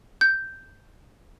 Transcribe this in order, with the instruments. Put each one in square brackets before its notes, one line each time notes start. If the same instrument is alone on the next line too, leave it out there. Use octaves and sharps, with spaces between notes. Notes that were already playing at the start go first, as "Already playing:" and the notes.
[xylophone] G6